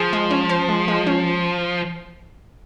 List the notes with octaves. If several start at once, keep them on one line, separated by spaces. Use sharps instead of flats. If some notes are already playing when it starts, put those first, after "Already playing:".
Already playing: F3 G#4
G#3
C#4
C5
G#3
G#3
C#4